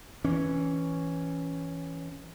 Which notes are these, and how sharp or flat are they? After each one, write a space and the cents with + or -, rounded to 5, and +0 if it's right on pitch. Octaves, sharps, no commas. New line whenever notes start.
E3 +0 C#4 +0